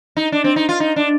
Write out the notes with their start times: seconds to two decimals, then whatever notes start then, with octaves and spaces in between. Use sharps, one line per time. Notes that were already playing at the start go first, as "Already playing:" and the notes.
0.17 D#4
0.32 D4
0.44 C4
0.56 D#4
0.69 F4
0.80 D#4
0.96 D4